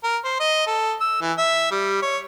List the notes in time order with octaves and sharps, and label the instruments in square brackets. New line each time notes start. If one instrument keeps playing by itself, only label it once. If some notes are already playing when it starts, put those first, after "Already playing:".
[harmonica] A#4
C5
D#5
A4
E6
E3
E5
G3
C#5